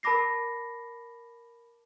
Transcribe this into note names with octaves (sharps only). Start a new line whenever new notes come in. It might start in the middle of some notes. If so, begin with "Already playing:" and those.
A#4 A5 B5 D6 A#6 C7